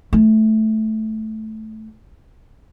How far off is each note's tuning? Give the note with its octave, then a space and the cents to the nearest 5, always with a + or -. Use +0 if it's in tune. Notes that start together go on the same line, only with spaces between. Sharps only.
A3 -10